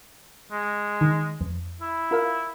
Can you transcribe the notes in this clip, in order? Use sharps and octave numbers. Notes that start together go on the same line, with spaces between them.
G#3
D#3
F2
E4
F4 A#4 F5